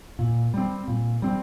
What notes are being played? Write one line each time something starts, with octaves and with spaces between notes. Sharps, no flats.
A#2
G3 C4
A#2
G3 C4